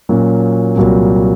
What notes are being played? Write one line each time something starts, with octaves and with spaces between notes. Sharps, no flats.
A#2 F#3 A#3 C#4 F#4
C2 A#2 F#3 A#3